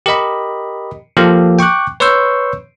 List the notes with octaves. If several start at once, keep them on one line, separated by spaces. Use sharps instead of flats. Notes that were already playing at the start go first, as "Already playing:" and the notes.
G4 A#4 D#5 B5
F3 A#3 G4 A4
G5 C#6 D6 F#6
B4 C#5 C6 C#6 E6 G6